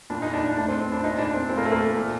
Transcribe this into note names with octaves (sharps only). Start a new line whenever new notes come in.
A#2 D4
D#4
D4
D4
A2 D4
C4
C4
D4
A#2 D#4
D4
C4
A#2 C4
A#3
A3
A#3
A#2